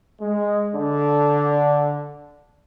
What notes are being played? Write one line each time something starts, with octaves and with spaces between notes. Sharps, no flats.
G#3
D3